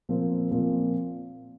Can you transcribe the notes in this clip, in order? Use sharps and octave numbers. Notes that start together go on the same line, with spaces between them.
A#2 F3 C4 F4 A#4
A#2 F3 C4 F4 A#4